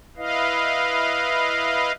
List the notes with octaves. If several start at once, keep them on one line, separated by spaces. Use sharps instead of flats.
E4 B4 D#5 F5